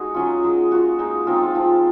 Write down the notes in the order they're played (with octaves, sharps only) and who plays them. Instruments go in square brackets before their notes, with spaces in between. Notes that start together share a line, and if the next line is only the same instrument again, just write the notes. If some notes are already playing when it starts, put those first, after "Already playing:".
Already playing: [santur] G#3 D#4 F#4 G#4
F#3 C#4 F4
G#3 D#4
A#3 F4 F#4
G#3 D#4
G#3 C4 D#4 F4
F4
F3 C4 F4